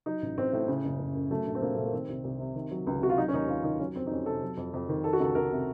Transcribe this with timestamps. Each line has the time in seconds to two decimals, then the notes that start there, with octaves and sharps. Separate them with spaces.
0.06 F#3 D#4
0.22 A1
0.37 A1 C4
0.53 A2
0.68 C#3
0.84 F#1
0.99 F#1
1.16 F#2
1.31 F#3 A3
1.46 A#1
1.55 C4
1.61 A#1 A#3
1.75 A#2 A3
1.84 A#3
1.93 D#3 C4
2.09 C2
2.24 C2
2.39 C3
2.55 D#3
2.71 F#3
2.87 C#2
3.01 C3 F#4
3.09 F4
3.18 F#3 D#4
3.28 C#4
3.33 D#2 D#4
3.48 D#2 F4
3.64 D#3 D#4
3.79 F#3 C#4
3.95 F2 C4
4.07 D#4
4.11 F2 C#4
4.26 C3 A4
4.42 F#3
4.57 F2
4.73 F2
4.89 D#3
5.04 D#3 A4
5.13 F#4
5.20 C#2 A4
5.35 C#2 A#4
5.51 C3